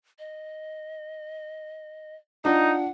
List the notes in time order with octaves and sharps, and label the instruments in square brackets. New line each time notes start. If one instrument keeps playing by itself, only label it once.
[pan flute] D#5
[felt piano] D4 F4 [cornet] D#4 [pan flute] F#5